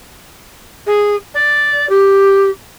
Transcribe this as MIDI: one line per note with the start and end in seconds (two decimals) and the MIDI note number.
0.86 1.15 68
1.34 1.87 74
1.89 2.49 67